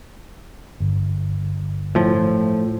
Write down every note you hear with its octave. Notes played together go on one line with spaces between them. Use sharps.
G1
A2 F3